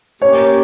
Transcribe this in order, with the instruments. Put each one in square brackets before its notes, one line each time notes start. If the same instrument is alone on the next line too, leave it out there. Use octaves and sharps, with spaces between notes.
[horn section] A#3 C#4 G4 [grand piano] C#5